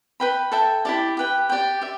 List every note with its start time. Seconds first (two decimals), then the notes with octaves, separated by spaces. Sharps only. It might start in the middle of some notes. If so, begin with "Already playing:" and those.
0.20 B4 G5 B5
0.52 A4 E5 G5
0.85 E4 G4 D5 A5
1.17 G4 B4 G5
1.49 G4 D5 G5
1.81 G4 E5